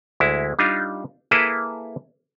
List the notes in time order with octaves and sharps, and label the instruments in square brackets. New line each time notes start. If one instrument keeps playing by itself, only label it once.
[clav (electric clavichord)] D2 G#3 E4
G3 D4 D#4 F4
A#3 E4 G#4 A4 B4